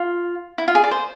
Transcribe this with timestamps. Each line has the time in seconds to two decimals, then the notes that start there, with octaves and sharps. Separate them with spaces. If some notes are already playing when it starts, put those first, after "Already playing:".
Already playing: F4
0.58 E4
0.68 F4
0.75 G#4
0.84 D5
0.91 C5